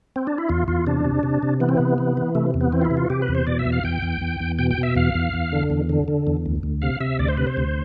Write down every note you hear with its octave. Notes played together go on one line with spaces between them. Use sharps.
C4
D4
E4
E2 F4
E2 F4
C3 D4
C3
C3
C3
E3 B3
C4
C3 B3
E3
E3
C3 A3
E2
B3
E3 C4
F4
E4
C3
F4
C3 G4
B4
E2
C5
B2 D5
E5
E2
F5
E2 G5
E2
E2
E2
B2 G5
G5
B2
E5
E2 F5
E2
E2
D3
E2
D3
D3
E2
D2
D2
C3 F5
C3 E5
D2 D5
C5
C3 B4
C5
D2